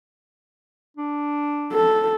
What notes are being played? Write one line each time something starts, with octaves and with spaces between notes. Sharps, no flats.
D4
A4